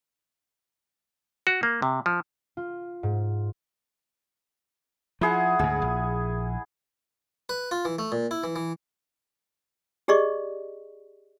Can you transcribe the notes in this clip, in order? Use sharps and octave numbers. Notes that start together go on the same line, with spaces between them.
F#4
A#3
C3
F3
F4
G#2
F3 E4 G#4 F#5
D2 G#2 G#4
A#1
B4
F4
E3
A3
A#2
E4
E3
E3
G4 G#4 D5 D#5 C#6